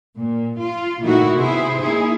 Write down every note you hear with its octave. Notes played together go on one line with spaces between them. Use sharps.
A#2
F4
A#2 D#3 A3 E4 F#4
C3 B3 E4 G#4 C5
A#3 D#4 E4 G#4